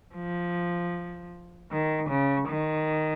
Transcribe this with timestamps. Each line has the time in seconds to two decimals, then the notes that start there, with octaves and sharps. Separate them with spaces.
0.15 F3
1.71 D#3
2.09 C#3
2.49 D#3